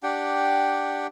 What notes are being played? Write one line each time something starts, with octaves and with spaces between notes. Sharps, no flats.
D4 G4 F#5 G5